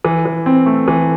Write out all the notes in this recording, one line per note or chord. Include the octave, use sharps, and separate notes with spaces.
E3
E3
C4
A3
E3